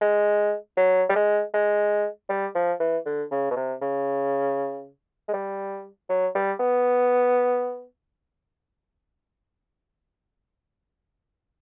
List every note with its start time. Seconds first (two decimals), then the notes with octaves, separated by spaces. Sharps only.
0.02 G#3
0.77 F#3
1.09 G3
1.16 G#3
1.54 G#3
2.29 G3
2.55 F3
2.80 E3
3.06 D3
3.31 C#3
3.51 B2
3.56 C3
3.82 C#3
5.28 G#3
5.34 G3
6.10 F#3
6.35 G3
6.60 B3